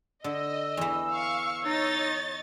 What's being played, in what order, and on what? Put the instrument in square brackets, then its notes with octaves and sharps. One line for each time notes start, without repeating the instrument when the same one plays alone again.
[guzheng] D3 [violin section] D#5 [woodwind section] E6
[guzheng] E2 E3
[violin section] F5 C#6
[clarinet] D#4 [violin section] C#5 D#5 A6